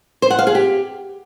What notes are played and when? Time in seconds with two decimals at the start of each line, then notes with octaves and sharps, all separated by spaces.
0.22 C5
0.30 F#5
0.39 F5
0.47 G#4
0.55 G4